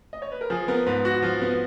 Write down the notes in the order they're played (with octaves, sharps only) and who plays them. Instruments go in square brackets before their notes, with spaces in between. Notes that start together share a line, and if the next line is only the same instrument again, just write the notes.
[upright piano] D#5
C#5
B4
A#4
[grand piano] F3 [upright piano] G#4
[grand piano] B3 [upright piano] A#4
[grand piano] G#2 [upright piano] B4
[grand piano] F#4
F3
B3